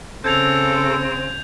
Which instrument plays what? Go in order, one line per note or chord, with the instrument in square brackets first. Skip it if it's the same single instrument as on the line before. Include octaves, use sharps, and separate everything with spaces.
[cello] C#3 [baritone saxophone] C4 [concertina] A4 [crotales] G6 G#6 F7